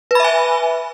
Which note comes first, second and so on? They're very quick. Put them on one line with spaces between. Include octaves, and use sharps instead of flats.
B4 B5 E5 G#5